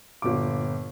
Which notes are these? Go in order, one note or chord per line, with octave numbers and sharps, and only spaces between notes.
G1 A#2 D6